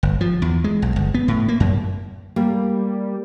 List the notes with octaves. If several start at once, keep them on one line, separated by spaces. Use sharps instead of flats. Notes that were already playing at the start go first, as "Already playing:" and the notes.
G1
F3
E2
G#3
B1
G1
B3
A2
A#3
F#2
G3 A#3